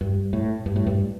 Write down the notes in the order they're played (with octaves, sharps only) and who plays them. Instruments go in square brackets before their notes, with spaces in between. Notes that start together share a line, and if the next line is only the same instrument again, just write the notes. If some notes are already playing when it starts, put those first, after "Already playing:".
[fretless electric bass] G2
A2
G2
A2
G2